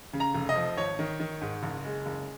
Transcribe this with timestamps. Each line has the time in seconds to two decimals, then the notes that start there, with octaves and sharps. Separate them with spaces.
0.13 C#3
0.20 A#5
0.35 F1
0.49 D#5
0.56 F3
0.77 G#1 C#5
0.99 D#3
1.20 D#3
1.41 G#2
1.63 F#1
1.84 G#3
2.06 F#1